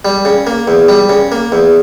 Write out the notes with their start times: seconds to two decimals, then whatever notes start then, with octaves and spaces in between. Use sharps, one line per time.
0.05 G3
0.25 C#3
0.47 A#3
0.68 E2
0.88 G3
1.09 C#3
1.32 A#3
1.52 E2